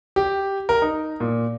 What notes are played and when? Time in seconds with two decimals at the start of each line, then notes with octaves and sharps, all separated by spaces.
0.16 G4
0.69 A#4
0.82 D#4
1.20 A#2